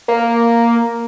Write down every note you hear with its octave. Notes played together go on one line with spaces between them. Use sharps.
A#3